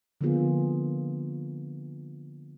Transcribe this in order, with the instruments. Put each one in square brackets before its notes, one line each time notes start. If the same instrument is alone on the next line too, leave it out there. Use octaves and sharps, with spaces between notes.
[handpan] D3 F3 A#3 B3 F4 G#4